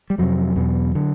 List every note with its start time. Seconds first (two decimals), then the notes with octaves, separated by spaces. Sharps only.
0.10 G3
0.18 F2 C3 F#3
0.56 E2 B2
0.95 D3